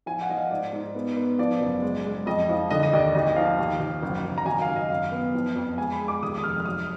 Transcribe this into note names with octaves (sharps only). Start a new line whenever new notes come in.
F3 G#5
F#5
F3 D#5
F5
G#2 D5
G#2
B3
B3
F3 D5
F#1
G#3
G#3
F2 D#5
F3
D3 D#5
D#5
D#2 D5
G#1 D#5
F3 F5
D#2
D#2
F#1
F#1
A#5
G#1 G#5
F5
G#1
D#5
F#2 F5
B3
F3
F2
G#3 G#5
B5
G#3
D6
D#2 D#6
D#6
F1 F6
F6
F#3 D#6